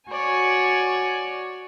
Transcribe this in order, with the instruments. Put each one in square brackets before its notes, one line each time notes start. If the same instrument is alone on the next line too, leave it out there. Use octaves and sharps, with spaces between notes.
[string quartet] F#4 C#5 D5 G#5